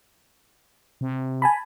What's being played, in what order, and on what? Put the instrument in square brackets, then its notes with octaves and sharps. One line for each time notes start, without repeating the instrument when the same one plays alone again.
[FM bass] C3
[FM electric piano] G#5 A5 B5